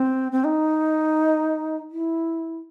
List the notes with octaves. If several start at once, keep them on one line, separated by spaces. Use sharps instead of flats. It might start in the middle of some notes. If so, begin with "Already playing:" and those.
Already playing: C4
C4
D#4
E4